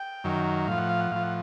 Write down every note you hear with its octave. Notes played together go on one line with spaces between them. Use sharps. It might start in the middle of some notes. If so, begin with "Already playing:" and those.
Already playing: G5
F#2 D#3 F#3
A2 F3 F5
F#5
F5
F#5
A2 F3 F5
F#5